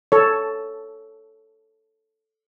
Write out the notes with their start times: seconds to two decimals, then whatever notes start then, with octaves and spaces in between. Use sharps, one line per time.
0.12 A4 C#5